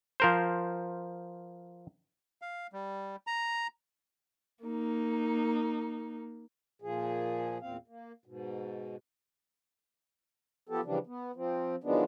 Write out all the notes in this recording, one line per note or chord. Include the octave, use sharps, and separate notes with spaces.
F3 A#4 C5
F5
G3
A#5
A#3 D#4
A#2 F3 G#4
E2 A#2 C4 F5
A#3
G#2 B2
F3 B3 G4 A4
C#3 E3 F3 G3 D4
B3
F3 C4
D#3 F3 F#3 G#3 B3 D4